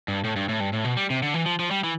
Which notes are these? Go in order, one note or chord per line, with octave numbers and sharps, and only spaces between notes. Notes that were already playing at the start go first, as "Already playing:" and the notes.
G2
A2
G2
A2
G2
A2
B2
G3
C3
D3
E3
F3
F3
G3
E3